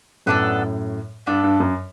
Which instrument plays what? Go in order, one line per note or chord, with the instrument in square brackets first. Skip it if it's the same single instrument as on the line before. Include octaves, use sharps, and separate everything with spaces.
[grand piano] F#2 A2 [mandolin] B3 D4 A4
[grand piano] G2 [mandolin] B3 D4 A4
[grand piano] G2
F#2